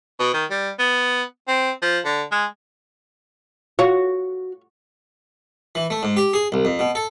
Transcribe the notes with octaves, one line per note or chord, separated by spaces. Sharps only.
B2
D#3
G3
B3
C4
F3
D3
G#3
F4 F#4 C#5
E3
A3
G#2
G4
G#4
C2
F2
B2
A4